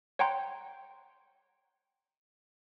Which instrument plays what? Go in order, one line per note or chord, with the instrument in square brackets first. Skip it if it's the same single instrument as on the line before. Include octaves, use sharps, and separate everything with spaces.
[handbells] C#5 F#5 G5 A#5 C6 G6